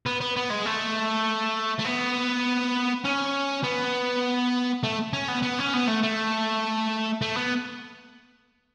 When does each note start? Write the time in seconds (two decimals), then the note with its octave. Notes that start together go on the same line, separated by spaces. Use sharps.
0.06 B3
0.21 B3
0.36 B3
0.50 G#3
0.66 A3
1.79 A3
1.85 B3
3.04 C#4
3.64 B3
4.83 A3
5.13 C#4
5.28 B3
5.43 B3
5.59 C#4
5.74 B3
5.88 A3
6.03 A3
7.22 A3
7.37 B3